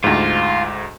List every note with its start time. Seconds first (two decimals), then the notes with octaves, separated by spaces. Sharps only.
0.04 D2 G#2 F4